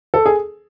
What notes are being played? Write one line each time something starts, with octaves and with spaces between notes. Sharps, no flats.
A4
G#4